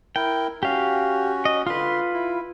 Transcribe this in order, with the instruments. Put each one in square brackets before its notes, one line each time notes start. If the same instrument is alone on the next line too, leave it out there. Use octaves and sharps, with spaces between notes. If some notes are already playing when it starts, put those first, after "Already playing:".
[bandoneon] E4 A#4 [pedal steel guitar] G5
[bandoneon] C#4 F#4 [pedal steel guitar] G4 F5
[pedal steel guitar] D#5
[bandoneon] D3 C6 [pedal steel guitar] F4 B4
[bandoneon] E4